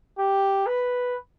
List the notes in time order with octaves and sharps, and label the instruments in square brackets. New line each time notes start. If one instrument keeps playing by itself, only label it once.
[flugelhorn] G4
B4